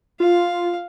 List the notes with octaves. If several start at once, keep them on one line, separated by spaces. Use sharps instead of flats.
F4 F5